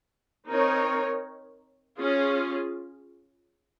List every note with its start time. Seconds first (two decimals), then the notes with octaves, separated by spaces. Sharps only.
0.47 C4 D#4 A#4 C#5
1.99 C#4 F4 G#4